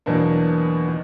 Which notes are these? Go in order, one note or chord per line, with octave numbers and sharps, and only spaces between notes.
E2 B2 F#3 A#3 D4
D#3